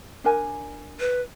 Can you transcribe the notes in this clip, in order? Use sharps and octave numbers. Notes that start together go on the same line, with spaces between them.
D4 A#4 G#5
B4